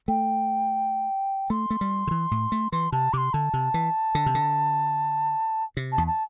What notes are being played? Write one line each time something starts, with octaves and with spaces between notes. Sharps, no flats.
A3 G5
A3 C6
A3
G3
D3
E3
A2
A3
E3 C6
C3 A5
C3 C6 D6
D3 A5
C3
E3
D3
C3
D3
C3
A5
E2
A5